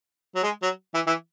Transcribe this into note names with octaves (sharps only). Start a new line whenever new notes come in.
F#3
G#3
F#3
E3
E3